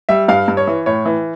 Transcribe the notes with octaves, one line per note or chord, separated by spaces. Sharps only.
G3 E5
G2 F5
G2
C#5
E3
A2 C#5
E3